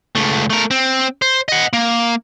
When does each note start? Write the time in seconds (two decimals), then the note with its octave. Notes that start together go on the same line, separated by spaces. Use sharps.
0.15 C#2 A3
0.50 A3 A#4
0.71 C4
1.22 C5
1.49 D#5 F#5
1.73 A#3